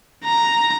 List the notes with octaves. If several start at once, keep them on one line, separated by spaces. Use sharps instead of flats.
A#5